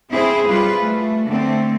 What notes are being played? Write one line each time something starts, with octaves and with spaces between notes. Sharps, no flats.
C4 E4 G#4 C5
G3 F4 B4
A3
D3 A3 C4